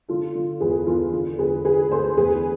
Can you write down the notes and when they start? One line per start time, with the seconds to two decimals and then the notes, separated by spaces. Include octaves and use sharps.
0.09 D3 F4 A4
0.35 D3
0.61 E2 G#4 B4
0.86 E2 F4 A4
1.13 D3
1.39 D3 G#4 B4
1.64 D3 G#4 B4
1.91 D2 A4 C5
2.17 E2 G#4 B4